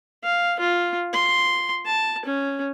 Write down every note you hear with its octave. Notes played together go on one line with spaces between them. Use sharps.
F5
F4
C6
A5
C#4